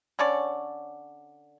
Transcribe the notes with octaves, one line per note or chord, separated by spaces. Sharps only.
D3 C#4 C#5 D5